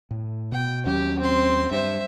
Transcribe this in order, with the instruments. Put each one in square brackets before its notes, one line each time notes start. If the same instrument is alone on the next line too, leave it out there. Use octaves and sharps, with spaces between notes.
[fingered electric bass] A2
[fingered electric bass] B2 [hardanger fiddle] G5
[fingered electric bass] D#2 F#3 C#4 [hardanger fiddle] G4
[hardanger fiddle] C4 C6
[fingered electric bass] G2 [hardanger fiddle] C5 E5